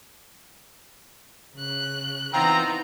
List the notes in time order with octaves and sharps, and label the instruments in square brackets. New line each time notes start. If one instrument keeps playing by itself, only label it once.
[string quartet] C#3 F#6
[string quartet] E3 B3 D#4 [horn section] C4 F4 A#5